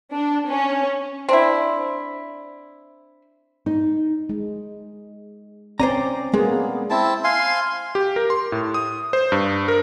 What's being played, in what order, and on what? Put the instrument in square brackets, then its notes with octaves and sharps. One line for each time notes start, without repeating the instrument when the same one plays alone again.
[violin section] D4
C#4
[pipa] C4 D4 E4
[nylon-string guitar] D#4
[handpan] G#3
[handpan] C4 C#4 D5 [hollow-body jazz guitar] C5 G#5 A#5
[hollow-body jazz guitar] G#3 [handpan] A#3 B3 G#4
[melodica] C4 E4 A5
F5 G#5 C6
[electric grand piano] G4
A#4
C6
A2
D#6
C5
G2
A#4